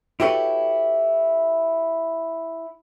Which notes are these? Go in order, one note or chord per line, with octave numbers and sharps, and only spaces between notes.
E4 F#4 G4 A4 B4 C#5